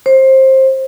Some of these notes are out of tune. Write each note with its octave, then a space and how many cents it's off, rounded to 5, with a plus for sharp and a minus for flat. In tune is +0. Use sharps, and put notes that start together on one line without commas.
C5 +20